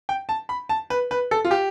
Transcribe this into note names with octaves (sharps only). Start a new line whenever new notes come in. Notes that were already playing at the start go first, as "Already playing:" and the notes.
G5
A5
B5
A5
B4
B4
A4
F4
G4